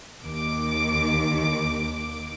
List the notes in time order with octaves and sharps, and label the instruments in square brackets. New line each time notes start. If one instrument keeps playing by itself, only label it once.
[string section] D#2 D#3 D6